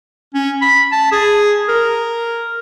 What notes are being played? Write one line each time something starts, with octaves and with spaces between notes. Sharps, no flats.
C#4
B5
A5
G#4
A#4